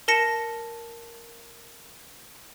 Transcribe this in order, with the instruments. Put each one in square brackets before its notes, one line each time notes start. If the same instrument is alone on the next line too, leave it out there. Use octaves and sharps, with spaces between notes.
[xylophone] A#4 A5 A#6 C#7 E7